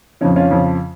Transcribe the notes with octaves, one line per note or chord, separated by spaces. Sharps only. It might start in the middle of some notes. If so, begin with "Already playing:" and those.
F2 C#3 F3 C#4
C#4 F4
F2 C#3 F3